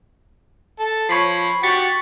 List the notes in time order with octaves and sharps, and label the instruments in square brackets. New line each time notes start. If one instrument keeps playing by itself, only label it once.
[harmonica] A4
[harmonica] F3 [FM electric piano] C#5 B5 C7
[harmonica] F#4 G4 [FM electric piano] C#6 A6 B6